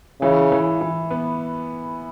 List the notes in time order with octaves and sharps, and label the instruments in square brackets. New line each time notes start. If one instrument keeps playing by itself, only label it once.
[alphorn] C#3 [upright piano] E3
[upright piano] E3
E3
B3